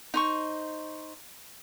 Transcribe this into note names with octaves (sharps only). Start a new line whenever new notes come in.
D#4 C5 C#6